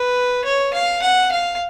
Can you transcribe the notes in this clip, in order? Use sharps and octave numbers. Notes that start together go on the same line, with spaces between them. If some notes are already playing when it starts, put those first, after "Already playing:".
Already playing: B4
C#5
F5
F#5
F5